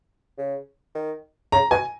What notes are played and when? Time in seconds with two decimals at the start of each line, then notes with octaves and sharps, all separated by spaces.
0.38 C#3
0.95 D#3
1.52 C#3 A#5
1.71 B2 G#5